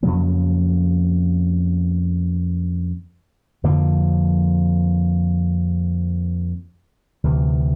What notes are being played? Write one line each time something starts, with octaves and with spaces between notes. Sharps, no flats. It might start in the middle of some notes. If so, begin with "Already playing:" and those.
F2 C#3 F#3 A#3
F2 D3 F3 A#3
D2 C3 E3